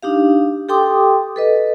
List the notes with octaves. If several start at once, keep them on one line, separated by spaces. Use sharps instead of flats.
D4 D#4 G4 F5
G4 A4 G5 C6 D6 D#6
A4 B4 D#5